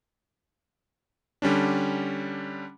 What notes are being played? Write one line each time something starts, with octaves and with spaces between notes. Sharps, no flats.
D3 G3 C#4 D4